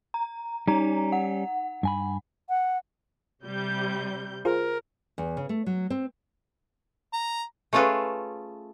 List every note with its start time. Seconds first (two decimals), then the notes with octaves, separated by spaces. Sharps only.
0.14 A#5
0.68 G3 C#4 D#4 A#5
1.12 F#5
1.83 G2 G#5 B5
2.49 F#5
3.43 C3 G3 G6
4.45 F4 G#4 A#4 C5
5.18 E2
5.37 C#3
5.49 A3
5.66 F#3
5.90 C4
7.13 A#5
7.73 A3 C#4 F4 G#4 A4 B4